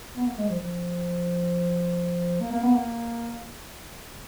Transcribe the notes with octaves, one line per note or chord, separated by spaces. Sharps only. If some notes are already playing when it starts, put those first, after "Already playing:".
B3
A#3
G#3
F3
F3
A#3
A#3
B3
A#3